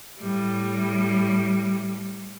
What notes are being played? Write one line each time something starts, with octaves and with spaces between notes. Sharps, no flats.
A2 G3